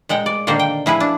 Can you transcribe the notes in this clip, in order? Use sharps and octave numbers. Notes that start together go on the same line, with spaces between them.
A#2 G#3 F#5 G5
D5
A#2 D3 D#3 A#3 C5
G5
F3 E4 G#4 B4
D4